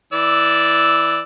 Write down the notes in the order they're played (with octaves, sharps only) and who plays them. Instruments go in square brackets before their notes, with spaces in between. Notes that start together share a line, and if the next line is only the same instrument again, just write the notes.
[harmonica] E3 D5 E6